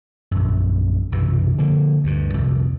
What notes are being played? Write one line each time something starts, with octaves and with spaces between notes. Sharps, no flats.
A#1 F#2
B1 F#2 C3 E3
D3 F3 A#3
D2 G2
C2 F2 A#2